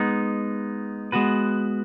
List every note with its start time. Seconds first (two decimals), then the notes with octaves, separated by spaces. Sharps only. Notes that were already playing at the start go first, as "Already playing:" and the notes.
Already playing: G#3 B3 D#4
1.12 G#3 B3 F#4 B4